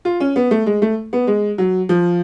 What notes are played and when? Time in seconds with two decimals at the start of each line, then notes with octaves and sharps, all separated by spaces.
0.05 F4
0.20 C#4
0.36 B3
0.51 A3
0.66 G#3
0.82 A3
1.13 B3
1.27 G#3
1.58 F#3
1.89 F3